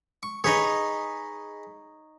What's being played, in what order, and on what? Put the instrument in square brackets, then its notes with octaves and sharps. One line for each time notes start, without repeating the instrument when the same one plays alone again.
[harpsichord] C#6
[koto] D#4 C#5 [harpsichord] G#4 B4 D#5